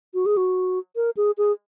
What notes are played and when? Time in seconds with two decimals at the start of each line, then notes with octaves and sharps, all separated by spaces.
0.14 F#4
0.26 G#4
0.37 F#4
0.96 A#4
1.17 G#4
1.38 G#4